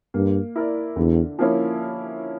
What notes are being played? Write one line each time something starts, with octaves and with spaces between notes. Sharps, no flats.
G2 A#3
E4 A#4 D5
E2 D3
F3 A#3 C#4 E4